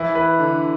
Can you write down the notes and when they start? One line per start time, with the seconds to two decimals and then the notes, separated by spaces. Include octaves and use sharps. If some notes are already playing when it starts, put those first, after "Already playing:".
Already playing: E3 E4
0.15 B4
0.39 D3